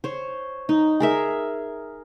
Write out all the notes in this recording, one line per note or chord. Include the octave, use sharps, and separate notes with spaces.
C5 C#5
D#4
G#4 A#4 E5